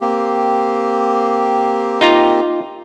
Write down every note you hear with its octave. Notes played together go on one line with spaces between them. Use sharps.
A#3 C4 G4
D#4 F4 A#5